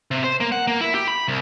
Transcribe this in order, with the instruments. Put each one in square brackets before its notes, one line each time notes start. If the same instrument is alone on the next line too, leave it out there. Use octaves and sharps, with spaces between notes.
[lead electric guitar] C3
C5
A#3
F#5
A#3
E4
G4
B5
C2